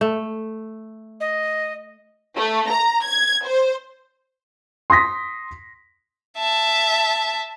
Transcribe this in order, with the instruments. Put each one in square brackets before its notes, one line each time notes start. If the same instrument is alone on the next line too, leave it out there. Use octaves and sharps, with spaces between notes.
[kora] A3
[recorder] D#5
[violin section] A3
A#5
G#6
C5
[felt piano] C6 D#6 A#6 B6
[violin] E5 A5